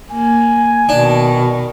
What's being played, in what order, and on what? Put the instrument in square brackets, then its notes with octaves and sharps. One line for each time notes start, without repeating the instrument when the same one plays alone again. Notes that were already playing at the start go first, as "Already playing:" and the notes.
[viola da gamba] A#3 [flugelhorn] G#5
[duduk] B2 [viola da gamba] D#3 [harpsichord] D4